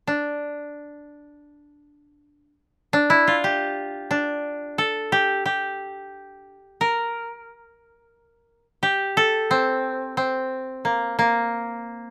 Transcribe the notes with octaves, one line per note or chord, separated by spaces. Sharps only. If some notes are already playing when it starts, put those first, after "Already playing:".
D4
D4
E4
F4
G4
D4
A4
G4
G4
A#4
G4
A4
C4
C4
A#3
A#3